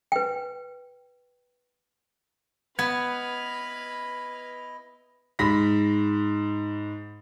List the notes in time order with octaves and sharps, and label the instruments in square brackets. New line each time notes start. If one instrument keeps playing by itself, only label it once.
[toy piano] B4 G5
[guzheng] B3 [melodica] E4 D#5 [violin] B4 F6 [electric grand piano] G#6
[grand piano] G#2 B5 A#6 B6